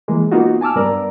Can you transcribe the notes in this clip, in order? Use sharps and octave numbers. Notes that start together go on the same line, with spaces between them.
E3 G#3 A#3
A#3 B3 D#4 F4 F#4
G#5 A5 D6 E6 F6
G2 B3 A#4 D5 A#5